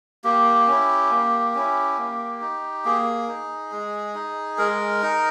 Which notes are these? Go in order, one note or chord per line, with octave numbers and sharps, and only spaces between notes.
A#3 G4
C#4 E4
A#3
C#4 E4
A#3
D#4
A#3 G#4
D#4
G#3
D#4
G#3 A#4
D#4